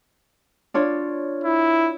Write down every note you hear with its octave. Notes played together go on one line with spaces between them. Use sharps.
D4 F4 C#5
E4